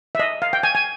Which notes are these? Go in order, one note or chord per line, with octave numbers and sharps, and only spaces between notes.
E5
D#5
F5
G5
G#5
G#5